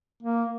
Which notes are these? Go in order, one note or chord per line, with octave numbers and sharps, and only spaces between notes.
A#3